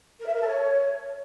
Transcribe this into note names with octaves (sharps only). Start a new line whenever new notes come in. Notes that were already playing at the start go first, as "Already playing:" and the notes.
A#4
E5
A#4
A4
C#5